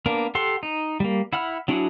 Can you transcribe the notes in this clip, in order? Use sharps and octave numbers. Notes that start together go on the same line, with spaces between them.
A#3 B3 D4 A#4
G4 A4 F#5 C6
D#4
G3 A#3
E4 F#5 B5 F6
F#3 D4 E4 F#4 G#4